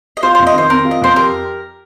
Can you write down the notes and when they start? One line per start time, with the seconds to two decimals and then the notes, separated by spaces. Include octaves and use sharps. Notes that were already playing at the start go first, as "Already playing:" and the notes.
0.17 D#5
0.23 F4 C5
0.35 F2 C5
0.47 D#5
0.54 D#3 C5
0.70 C4 A#4
0.85 F4
0.91 D#5
1.01 F2 C5
1.16 G4 A#4